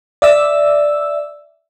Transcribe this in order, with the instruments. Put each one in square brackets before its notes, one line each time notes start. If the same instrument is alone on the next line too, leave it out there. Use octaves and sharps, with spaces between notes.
[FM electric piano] D5 E5 E6